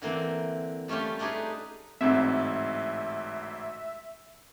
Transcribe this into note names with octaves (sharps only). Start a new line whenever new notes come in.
D3 E3 A#3 C4
G3 A3 C#4 F4 G4
A3 D4 D#4 G4 G#4 B4
A1 D2 G#2 C4 E5